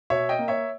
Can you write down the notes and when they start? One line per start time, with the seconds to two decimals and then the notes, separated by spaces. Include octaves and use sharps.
0.10 B2 C#5 E5
0.29 D#5 G5
0.39 A#3
0.48 C#5 E5